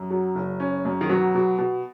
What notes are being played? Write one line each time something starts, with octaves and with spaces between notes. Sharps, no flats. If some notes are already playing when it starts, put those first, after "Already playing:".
Already playing: F#2
F#3
F#1
C#4
F#2
D#3
B2 F#3
B2
B2